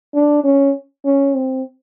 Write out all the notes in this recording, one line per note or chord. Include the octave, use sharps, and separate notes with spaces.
D4
C#4
C#4
C4